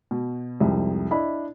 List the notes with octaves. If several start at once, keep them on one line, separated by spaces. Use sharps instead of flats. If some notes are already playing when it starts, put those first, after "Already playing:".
B2
C2 F2 G#2 C3
D4 E4 D#5 B5